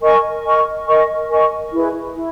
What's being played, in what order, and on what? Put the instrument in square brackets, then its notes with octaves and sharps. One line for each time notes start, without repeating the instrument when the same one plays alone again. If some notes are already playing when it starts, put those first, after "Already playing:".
[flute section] A#4 D#5 G#5 C#6
A#4 D#5 G#5 C#6
A#4 D#5 G#5 C#6
A#4 D#5 G#5 C#6
E4 G#4 B4
E4